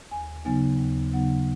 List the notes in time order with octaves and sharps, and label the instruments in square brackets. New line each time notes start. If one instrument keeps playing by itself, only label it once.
[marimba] D#2 G#5
C#3 F#3 B3 D#4 G#5
D#2
C#3 F#3 B3 D#4 F#5